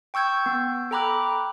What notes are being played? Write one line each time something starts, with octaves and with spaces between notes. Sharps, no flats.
G5 C#6 E6 G6 G#6
B3
A4 G5 A#5 B5 D6 F#6